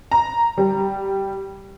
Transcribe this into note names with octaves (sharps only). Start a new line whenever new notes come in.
A#5
G3